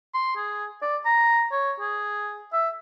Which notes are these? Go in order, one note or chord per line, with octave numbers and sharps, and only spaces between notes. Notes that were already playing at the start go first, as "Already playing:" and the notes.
C6
G#4
D5
A#5
C#5
G#4
E5